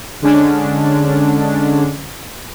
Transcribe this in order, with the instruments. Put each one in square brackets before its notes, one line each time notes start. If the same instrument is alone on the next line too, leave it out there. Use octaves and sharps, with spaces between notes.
[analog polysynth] D3 G#3 C#4 D4